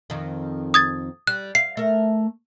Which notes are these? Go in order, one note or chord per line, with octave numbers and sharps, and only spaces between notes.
F2 D#3
D#6 G#6 A6
G3 F#6
F5 C7
A3 A#4